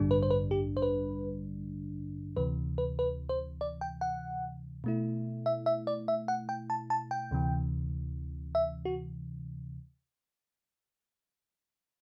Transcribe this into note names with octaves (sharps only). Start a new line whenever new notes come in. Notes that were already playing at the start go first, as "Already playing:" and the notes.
Already playing: A1 G2 D3 G3 D4
B4
C5
B4
G4
C5
B4
D2 C3 E3 B4
B4
B4
C5
D5
G5
F#5
B2 A3 E4
E5
E5
D5
E5
F#5
G5
A5
A5
G5
D2 C3 E3
E5
F#4